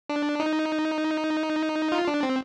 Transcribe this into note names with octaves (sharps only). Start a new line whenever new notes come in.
D4
D#4
F4
D4
C4